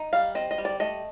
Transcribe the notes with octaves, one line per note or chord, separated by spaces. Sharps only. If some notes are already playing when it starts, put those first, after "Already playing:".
Already playing: D#4
G3 F5
C4 D#5
D#5
G3
D5
A3 D#5